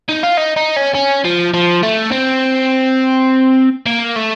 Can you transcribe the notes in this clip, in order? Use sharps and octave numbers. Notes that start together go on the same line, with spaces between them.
D#4
F4
D#4
D#4
C#4
C#4
F3
F3
A3
C4
A#3
A3